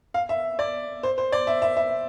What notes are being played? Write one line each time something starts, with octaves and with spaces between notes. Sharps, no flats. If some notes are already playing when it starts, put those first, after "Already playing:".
F5
E5
D5
C5
C5
D5
E5
E5
E5